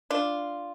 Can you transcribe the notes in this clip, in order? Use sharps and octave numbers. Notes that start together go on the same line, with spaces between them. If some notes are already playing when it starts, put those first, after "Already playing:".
D4 F4